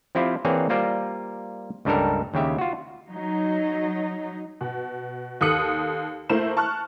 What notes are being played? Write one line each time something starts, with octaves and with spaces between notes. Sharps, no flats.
F3 C4 E4 F4 G4
E3 A#3 C4 G#4 C#5 D5
G3 A#3 F4 A#4 C5 D5
C#2 G2 G3 D4 A4 A#4
D#2 C#3 G4 E5
F4 F#4
F#3 D#4
B2
D#2 A4 D#6 C#7 F#7
A3 A#3 E4 A#4 C5 E7
A5 C#6 F6 F#6